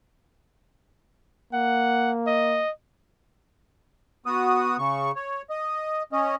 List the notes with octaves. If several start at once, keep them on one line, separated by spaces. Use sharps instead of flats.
A#3 F#5
D#5
B3 F#4 D#6
C#3 C#6
C#5
D#5
C#4 D#5